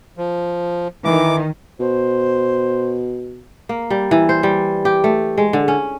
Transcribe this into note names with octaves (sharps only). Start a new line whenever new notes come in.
F3
D#3 E3 D#4 D6
B2 C5
A#3
G3
E3
C5
G3
G4
A3
G#3
D3
C#4